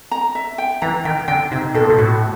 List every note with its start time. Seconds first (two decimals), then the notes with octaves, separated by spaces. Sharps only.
0.11 A#5
0.35 E5
0.58 G5
0.82 E3 A#5
1.05 D#3 G5
1.28 D3 G5
1.51 C3 D#4
1.74 B2 A4
1.82 A#2
1.90 B2
1.98 A2 F#4